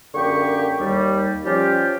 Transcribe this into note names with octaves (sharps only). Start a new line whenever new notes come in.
F#2 D3 A#3 G4 G5 C#6
D#2 G3
F3 G3 C#4 F4 G4